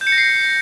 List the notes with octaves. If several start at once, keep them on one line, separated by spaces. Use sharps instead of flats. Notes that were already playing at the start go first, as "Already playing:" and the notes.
G6
C#7
A#6
C7